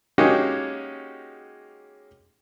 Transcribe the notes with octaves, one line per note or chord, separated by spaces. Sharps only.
G#3 A#3 C#4 D#4 F#4 G4